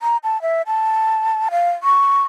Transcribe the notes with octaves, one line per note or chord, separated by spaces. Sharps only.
A#5
A5
E5
A5
F5
C#6